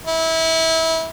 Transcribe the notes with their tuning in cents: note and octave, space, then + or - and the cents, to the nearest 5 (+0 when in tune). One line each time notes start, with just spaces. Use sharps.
E4 -25